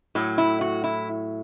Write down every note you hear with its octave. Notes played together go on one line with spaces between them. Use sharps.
A2 F#3
E4
F#4
E4